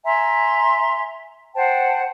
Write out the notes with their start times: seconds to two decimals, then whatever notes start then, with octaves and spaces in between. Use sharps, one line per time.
0.05 E5 G#5 A#5 C6
1.55 C5 F#5 G5 A5